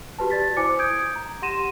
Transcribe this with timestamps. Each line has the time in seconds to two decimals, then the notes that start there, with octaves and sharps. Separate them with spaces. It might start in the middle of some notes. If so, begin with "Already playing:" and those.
0.19 F#4 G4 B4 A5
0.30 D5 A6 B6
0.57 E4 C5 G#5 D6 C#7
0.79 D#6 G6 G#6 D7
1.16 A#5
1.42 G4 F#5 C6 A#6 D#7 E7